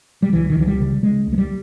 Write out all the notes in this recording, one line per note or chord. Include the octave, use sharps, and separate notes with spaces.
G3
C#2 E3
D#3
C#2 E3
G3
C#3
C#3 G#3
C#2
G#3
G3